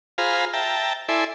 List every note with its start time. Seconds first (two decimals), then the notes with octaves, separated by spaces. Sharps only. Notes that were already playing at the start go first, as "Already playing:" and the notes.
0.18 F4 G#4 C5 F5 A#5 B5
0.53 E5 G5 A5 A#5
1.09 E4 A4 D5 E5 G#5 C6